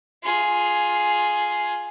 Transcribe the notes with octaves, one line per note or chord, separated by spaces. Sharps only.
F4 G#4